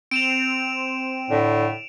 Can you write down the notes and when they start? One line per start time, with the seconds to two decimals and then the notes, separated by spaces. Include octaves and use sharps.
0.11 C4 D7 E7 F7
1.30 A2 D3